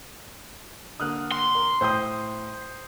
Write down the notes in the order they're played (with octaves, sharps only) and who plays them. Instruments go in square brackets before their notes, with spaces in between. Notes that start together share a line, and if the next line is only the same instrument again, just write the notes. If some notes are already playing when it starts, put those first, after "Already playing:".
[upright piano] D3 A#3 [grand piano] D#6 F6 F#6
[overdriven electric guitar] C6
[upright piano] A#4
[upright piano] A2 G6 [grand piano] C5 G5 D#6